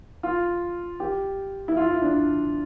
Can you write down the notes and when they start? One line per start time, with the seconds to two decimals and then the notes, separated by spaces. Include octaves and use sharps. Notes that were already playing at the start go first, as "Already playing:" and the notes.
0.23 F4
1.00 G4
1.68 E4
1.77 F4
1.90 E4
2.02 D4